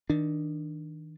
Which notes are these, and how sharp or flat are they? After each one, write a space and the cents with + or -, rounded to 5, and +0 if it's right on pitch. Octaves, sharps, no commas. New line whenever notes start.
D#3 +30 D4 +20